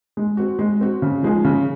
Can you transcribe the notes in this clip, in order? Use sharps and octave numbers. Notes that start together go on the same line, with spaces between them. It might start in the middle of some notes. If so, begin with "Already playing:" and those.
G#3
C4 F#4
G#3
C4 F#4
C#3
F3 G#3 D#4 G#4
C#3